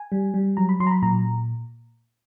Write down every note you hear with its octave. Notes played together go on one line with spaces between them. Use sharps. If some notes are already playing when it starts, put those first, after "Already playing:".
Already playing: G#5
G3
G3
F#3 A#5
B5
F#3 C6
A#5
B5
A#2 A#5